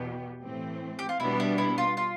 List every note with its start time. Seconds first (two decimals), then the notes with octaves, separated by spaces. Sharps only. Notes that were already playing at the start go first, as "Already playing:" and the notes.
Already playing: E2 B2 B3 G4
0.42 A2 E3 A3 C4
0.99 G4
1.09 F4
1.20 B2 G3 B3 D4 E4
1.40 E4
1.58 E4
1.78 F4
1.97 F4